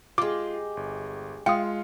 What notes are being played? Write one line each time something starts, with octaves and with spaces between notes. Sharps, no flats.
G#3 F4 G4 D6
G1
G#3 F4 F5 G5 D#6 C#7